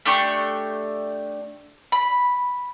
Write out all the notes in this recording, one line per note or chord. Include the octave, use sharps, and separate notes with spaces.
A3 D4 G4 C#6
B5